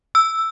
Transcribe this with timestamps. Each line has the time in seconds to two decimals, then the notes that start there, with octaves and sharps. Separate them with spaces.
0.15 E6